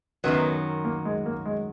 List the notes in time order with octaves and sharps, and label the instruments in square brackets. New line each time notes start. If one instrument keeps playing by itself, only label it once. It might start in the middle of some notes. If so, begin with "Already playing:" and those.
[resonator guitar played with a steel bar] F#2 D#3 F#3 [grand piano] B3
[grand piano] A#3
G#3
A#3
G#3